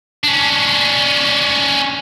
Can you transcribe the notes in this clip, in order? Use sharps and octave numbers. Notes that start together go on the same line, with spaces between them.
C#4 D4